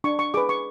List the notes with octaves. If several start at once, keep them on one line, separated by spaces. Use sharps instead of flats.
D4 C#6
C#6
G#4 B4 D6
C#6